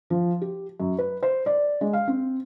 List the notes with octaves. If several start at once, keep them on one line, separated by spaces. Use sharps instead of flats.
F3
G4
F#2
B4
C5
D5
G#3
F5
C4